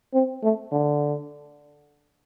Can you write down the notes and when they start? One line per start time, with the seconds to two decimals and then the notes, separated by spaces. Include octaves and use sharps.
0.14 C4
0.43 A3
0.72 D3